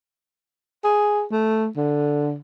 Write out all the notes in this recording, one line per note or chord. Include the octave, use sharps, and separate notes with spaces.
G#4
A3
D3